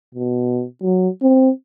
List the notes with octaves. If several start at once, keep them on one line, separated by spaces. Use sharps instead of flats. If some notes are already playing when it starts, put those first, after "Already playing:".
B2
F#3
C4